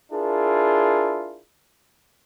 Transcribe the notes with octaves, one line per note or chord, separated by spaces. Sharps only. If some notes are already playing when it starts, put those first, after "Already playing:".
D4 E4 F4 G#4 A#4